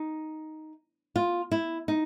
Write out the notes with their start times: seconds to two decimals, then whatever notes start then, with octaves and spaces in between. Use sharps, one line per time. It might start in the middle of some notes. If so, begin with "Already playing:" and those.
Already playing: D#4
1.16 F4
1.52 E4
1.88 D#4